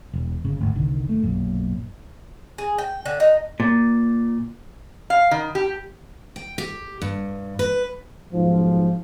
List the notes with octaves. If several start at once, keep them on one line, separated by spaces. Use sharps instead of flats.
E1
G1 C#3
G#1 D2
G1 C2 D3 D#3
A3
B1 F#2 A#2
G#4
G5
D3
D#4
A#2
F5
D#3
G4
G5
G4
G2
B4
B1 G#2 F3